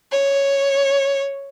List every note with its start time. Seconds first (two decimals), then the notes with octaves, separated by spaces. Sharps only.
0.12 C#5